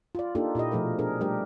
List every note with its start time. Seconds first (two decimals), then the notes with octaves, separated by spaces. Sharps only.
0.15 F4 D5
0.35 A#3 D4 D#4 F4 G4 A4
0.55 A#2 E4 G4 D#5
0.71 B2 F3 A3 G#4 A#4
0.99 D4 G#4 A#4
1.21 G3 A3 D4 G4 A#4